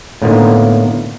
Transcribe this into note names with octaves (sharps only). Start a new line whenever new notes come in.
A2 D3 A#3 B3 D#4 F4